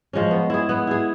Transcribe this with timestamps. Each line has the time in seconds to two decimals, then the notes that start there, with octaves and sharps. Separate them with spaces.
0.13 F3 G#3 C#4
0.31 B3
0.50 E4 G#4
0.69 B3
0.87 E4 G#4